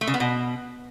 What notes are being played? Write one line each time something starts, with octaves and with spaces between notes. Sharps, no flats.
A3
C#3
B3
B2